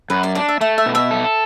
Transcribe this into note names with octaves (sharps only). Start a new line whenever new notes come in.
F#2 B4
D5
D4 D5
E5
A3 E5
E5
B2
E5
A4